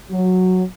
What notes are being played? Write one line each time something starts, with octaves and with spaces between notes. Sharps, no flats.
F#3